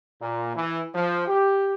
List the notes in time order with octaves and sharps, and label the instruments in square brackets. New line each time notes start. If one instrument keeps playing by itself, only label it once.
[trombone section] A#2
E3
F3
G4